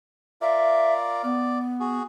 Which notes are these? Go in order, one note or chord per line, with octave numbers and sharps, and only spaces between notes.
F4 A#4 D5 E5
B3 D5
F#4 G#4